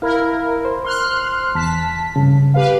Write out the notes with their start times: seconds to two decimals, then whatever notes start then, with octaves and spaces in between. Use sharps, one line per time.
0.02 E4 A#4 F5
0.65 C5
0.84 C6 F6 F#6
1.55 E2 A5 B6
2.16 G2 C#3
2.54 G4 B4 F5